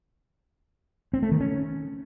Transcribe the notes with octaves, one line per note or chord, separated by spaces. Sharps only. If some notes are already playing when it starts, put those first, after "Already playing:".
C4
A3
D#3
C#4